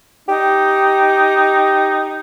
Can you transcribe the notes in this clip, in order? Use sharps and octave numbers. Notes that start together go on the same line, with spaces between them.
D#4 G4